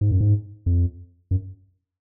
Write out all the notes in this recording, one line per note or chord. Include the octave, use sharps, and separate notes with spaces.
G#2
F#2
G#2
F2
F#2